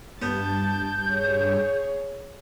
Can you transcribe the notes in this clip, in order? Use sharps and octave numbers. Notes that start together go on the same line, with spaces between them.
G2 B3 A5 G6
G#4 C#5